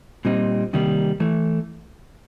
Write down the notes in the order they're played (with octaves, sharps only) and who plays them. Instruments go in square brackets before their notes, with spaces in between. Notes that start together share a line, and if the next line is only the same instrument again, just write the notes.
[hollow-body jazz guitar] A#2 G3 C4 D#4
C3 D#3 G3 A#3
E3 A3